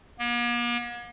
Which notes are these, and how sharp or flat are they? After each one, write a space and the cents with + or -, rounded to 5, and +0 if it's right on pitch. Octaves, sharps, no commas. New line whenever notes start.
A#3 +45